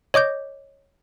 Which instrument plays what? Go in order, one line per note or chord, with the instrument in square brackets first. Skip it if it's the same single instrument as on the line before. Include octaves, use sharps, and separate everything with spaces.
[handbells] C#5 D#5 D6 G6